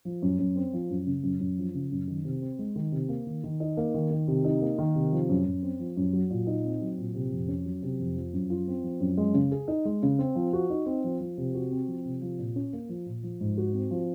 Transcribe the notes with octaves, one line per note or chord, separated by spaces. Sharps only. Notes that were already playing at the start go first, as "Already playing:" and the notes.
F3
F#2
F#2
C4
F3
F#2
C#3
F#2
F#2
F3
C#3
F#2
D#3
C3
C4
G#3
D#3
C3
A#3
D#3
D#3
D#4
A#3
D#3
D#3
C3
D#4
A#3
D#3
C3
F3
F#2
F#2
C4
F3
F#2
F#3
A#2
D#4
C4
F#3
A#2
C3
F2
C#4
F#3
C3
F2
F3
F#2
F4
C4
F3
F#2
G#3
C#3
G#4
D#4
G#3
C#3
C4
F3
F#4
D#4
C4
F3
F3
C3
F#4
C4
F3
C3
F3
A#2
C#4
A#3
F3
A#2
F3
G#2
F#4
C4
F3